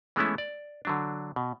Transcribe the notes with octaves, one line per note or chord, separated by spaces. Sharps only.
E3 G#3 A3 B3 C#4 E4
D5
D3 F#3 D4
B2